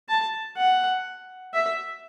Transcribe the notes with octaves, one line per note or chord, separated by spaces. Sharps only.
A5
F#5
E5